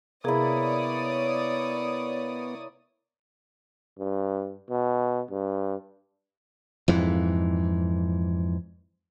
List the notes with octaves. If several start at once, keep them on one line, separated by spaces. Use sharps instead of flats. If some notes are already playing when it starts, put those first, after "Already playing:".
C3 A#3 B3 E4 G#4 C#5 D5 D#6
G2
B2
G2
F2 G#2 E3